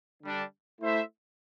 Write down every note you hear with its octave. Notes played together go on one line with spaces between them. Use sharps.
D3 G3 D4
A3 E4 C5 E5